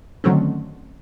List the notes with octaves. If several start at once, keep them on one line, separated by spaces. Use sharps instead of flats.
D3 D#3 F#3 A3 C4 C#4